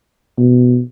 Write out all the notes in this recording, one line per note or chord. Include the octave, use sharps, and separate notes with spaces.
B2